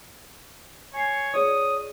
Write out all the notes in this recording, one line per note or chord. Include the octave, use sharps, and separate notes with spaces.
C#5 G#5 C7
F4 G#4 C#5 D5 D#6